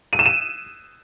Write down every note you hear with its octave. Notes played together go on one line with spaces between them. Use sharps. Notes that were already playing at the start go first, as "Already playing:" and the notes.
D#7
E7
D#7